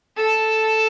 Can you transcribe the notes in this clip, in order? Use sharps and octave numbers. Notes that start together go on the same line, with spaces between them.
A4